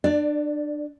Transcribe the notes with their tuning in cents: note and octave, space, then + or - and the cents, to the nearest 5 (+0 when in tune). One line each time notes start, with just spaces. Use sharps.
D4 +25 D5 +0